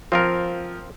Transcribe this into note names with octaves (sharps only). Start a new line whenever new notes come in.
F3 C4 F4 A#4